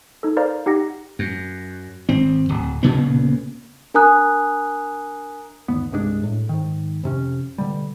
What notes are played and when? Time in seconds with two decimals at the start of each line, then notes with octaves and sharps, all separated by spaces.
0.23 D#4 A4
0.37 A#4 C5 D5 F5 A#5
0.66 D#4 G4 F#5 A#6
1.19 F#2
2.09 G#1 C4
2.49 D1
2.83 D2 A#2 C#3 B3
3.94 D4 A#4 G#5 A#5 D#6 F#6
5.68 G1 D#2 B3
5.92 C2 G2 G#3 D4
6.23 A2
6.49 G#2 D#3
7.03 F2 C3 C#4
7.58 B2 D3 G3